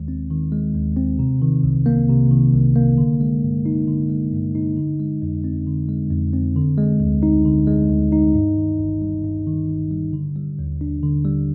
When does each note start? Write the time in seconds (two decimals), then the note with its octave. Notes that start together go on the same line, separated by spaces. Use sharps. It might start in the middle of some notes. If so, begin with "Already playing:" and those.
Already playing: D#2 D#3 G#3
0.08 C4
0.30 D#3
0.52 G#3
0.75 D#2
0.96 C4
1.19 C3
1.42 D#3
1.63 C2
1.86 A#3
2.09 C3
2.31 D#3
2.54 C2
2.76 A#3
2.98 D3
3.21 G#3
3.43 G2
3.66 D#4
3.88 D3
4.09 G#3
4.32 G2
4.55 D#4
4.77 D3
5.00 G#3
5.22 F2
5.44 C4
5.66 D3
5.89 G#3
6.11 F2
6.33 C4
6.56 D3
6.78 G#3
7.00 D2
7.23 D#4
7.45 D3
7.67 G#3
7.90 D2
8.12 D#4
8.35 G2
8.57 D#3
8.79 G1
9.02 G3
9.24 G2
9.47 D#3
9.69 G1
9.91 G3
10.13 D3
10.36 G3
10.59 D#2
10.81 D4
11.03 D3
11.25 G3